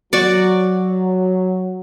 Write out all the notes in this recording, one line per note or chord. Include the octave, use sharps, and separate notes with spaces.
F#3 F#4 D5